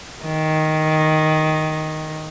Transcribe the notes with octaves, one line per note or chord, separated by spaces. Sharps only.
D#3